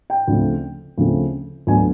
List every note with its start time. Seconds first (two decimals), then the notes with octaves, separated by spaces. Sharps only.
0.10 G5
0.28 D2 C#3 F3 A3 C4
0.98 D2 C#3 F3 A3 C4
1.67 D2 D3 F#3 B3 G#5